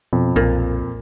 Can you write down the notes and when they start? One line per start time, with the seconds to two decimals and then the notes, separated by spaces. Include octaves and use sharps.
0.13 F2 B2
0.36 B1 A#2